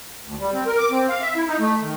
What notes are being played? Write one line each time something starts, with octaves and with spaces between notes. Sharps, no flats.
D2
G3
C4
A#4
D6
C4
F5
E5
E4
D#4
A3
D#3